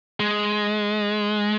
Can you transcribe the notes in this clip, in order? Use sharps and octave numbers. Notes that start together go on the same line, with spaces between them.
G#3